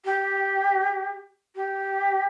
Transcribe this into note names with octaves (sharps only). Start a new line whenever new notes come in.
G4
G4